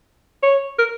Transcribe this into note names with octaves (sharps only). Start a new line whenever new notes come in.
C#5
A#4